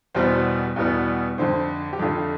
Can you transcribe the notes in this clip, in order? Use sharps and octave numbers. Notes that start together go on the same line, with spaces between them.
E2 B2 G3 B3 C5
E2 B2 G3 B3
F2 D3 A3 C5
G4
F2 D3 A3 F4